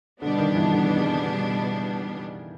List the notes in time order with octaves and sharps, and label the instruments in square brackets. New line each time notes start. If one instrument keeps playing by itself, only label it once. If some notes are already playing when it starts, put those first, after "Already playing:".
[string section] B2 G3 B3 D4 [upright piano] D3
[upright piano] D#3
E3
D3
D3
C#3